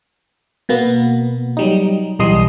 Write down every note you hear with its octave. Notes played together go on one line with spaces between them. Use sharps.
B2 A#3 B3
F#3 G3 D#4
B1 E3 G3 D#5 C6 D#6